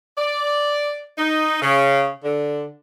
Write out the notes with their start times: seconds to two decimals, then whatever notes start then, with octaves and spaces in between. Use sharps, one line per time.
0.18 D5
1.18 D#4
1.61 C#3
2.23 D3